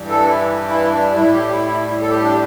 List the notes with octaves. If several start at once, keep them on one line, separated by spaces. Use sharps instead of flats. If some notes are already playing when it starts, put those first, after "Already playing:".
Already playing: G2 E3 G3
A4
D4
E4
E4
D4
A2 G3 E4
G4
E4
E4
A4
G4
D4